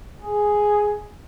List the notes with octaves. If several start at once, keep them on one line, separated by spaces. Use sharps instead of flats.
G#4